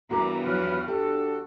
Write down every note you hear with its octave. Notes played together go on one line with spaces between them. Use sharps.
E2 G2 E3 F#4 A#4 A#5 D6
F3 F#3 F#4 B4 F6
D4 F#4 G4 A4